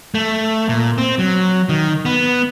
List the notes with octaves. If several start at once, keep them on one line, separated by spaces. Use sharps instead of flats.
A3
A#2
C4
F#3
D#3
B3